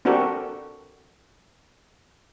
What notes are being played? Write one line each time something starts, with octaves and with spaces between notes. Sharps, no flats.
C4 D4 F#4 G4 A4 A#4